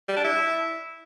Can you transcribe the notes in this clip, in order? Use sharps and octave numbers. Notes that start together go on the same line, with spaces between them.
G3
D4
E4